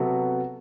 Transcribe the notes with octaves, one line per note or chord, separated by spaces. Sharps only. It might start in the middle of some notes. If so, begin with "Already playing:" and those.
Already playing: C3 F#3 B3 F#4 A4